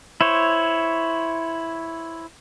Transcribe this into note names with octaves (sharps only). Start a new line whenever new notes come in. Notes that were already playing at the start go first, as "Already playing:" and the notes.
E4 C5 C#5